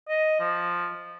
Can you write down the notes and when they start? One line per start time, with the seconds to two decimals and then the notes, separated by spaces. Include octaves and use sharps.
0.08 D#5
0.40 F3